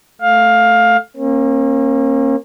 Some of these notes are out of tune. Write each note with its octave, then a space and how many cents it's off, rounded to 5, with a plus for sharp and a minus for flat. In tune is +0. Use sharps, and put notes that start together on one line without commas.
A3 +0 F5 +15
A#3 +0 C#4 -40